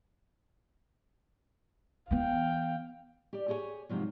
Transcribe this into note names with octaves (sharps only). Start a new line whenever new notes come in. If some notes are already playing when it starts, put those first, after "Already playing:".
E3 B3 F5 G5
G4 D5
G4 G#4 C#5 E5 G#5
G#2 C3 F3 F#3